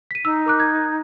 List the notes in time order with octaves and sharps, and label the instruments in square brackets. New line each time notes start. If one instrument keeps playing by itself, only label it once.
[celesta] B6 D#7
[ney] D#4 [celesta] E6
[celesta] A#4 D6 F#6
G#6